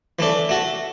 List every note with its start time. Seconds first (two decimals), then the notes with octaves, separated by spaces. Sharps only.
0.19 E3 A3 D4 A4
0.49 A3 F#4 A4